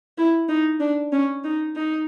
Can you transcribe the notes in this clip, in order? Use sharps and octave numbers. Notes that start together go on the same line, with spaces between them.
E4
D#4
D4
C#4
D#4
D#4